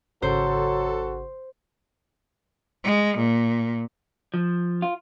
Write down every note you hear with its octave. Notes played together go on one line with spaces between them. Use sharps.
G#1 C#3 F#3 F#4 A4 C5
G#3
A#2
F3
F4